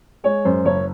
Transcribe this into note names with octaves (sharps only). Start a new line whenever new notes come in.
G#3 C#5
F#2 C5
F#1 C#5